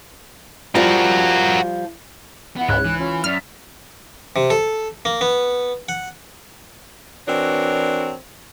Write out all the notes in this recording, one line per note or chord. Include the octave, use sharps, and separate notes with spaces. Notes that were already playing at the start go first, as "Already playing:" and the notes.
F3 G3 F4 F#4 A#4
B3 E4 F#5
C#2 G#2 C#5 F#6
E3
C#4 F4
F#2 D5 E5 F6
C3
A4
A#3
B3
F#5
E3 C4 D4 F#4 A#4 C#5